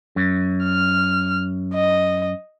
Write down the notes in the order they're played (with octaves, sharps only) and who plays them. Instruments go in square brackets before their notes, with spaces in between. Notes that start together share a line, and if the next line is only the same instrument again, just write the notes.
[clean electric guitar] F#2
[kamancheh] F6
D#5